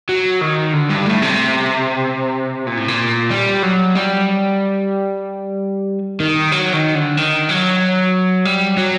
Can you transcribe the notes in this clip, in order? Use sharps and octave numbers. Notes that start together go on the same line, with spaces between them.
F#3
D#3
D3
G2
A2
C3
A#2
A2
A#2
G3
F#3
G3
D#3
F#3
D#3
D3
D#3
F#3
G3
F#3